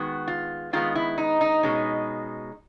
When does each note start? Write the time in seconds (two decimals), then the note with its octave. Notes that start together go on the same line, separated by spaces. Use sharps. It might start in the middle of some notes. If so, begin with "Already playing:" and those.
Already playing: D#3 G#3 B3 F#4
0.28 F4
0.73 D#3 G#3 B3 F4
0.95 E4
1.18 D#4
1.41 D#4
1.63 B2 G#3 C#4